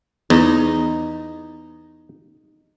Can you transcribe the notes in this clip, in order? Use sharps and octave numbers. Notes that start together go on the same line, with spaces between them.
E2 D#4